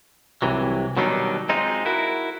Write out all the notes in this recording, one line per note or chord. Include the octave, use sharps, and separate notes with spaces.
C2 C3 E3 F#3
B2 D#3 F#3 G3 D4 D#4
G#3 C4 D#4 F4
E4 F#4 A#4